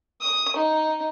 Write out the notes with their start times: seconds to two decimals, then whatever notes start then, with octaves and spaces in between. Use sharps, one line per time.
0.21 D#6
0.56 D#4